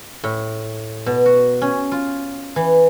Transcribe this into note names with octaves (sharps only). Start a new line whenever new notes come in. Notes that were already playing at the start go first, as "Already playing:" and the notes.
A2
B2
F#4
C#4
F4
E3